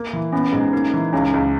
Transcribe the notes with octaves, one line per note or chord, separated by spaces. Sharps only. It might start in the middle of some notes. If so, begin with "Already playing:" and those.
Already playing: A#3
E3
B3 C#4
C#4
G#2 D#4
C#4
A#3 D#4
E3
D#4
C#2 C#4
C#2